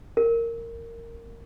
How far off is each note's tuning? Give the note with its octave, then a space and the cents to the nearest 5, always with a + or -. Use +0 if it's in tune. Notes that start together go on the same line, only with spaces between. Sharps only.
A#4 -15